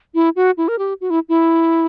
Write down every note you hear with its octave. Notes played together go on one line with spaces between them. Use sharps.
E4
F#4
E4
A#4
G4
F#4
E4
E4